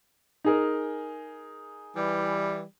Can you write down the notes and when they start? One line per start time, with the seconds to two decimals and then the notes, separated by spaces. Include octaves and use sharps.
0.45 D#4 G#4 A#4
1.96 E3 G3